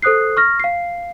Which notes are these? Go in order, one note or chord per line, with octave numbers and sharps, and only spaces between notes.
A4 C5 D#6 F#6 C7
C#6 F6 A#6
F5 C7